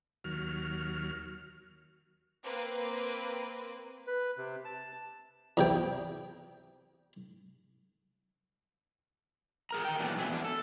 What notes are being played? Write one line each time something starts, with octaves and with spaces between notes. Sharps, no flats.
D#2 F#3 F6
A#3 C4 B4
B4
C3
A5
E2 C3 G5
G#4 A#4 A#5
A#4 G5
A#2 E3 F#3 A3 B3 D4
F2 B2 F#3 C#4 E4 E5
E2 D4
A4